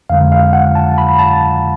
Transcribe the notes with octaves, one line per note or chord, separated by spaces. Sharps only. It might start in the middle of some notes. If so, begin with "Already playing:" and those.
F2 D3 G#3 F5
F5
F#5
A5
B5
A5